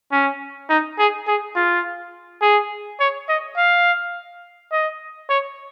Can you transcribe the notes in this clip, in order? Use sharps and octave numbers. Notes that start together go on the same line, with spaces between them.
C#4
D#4
G#4
G#4
F4
G#4
C#5
D#5
F5
D#5
C#5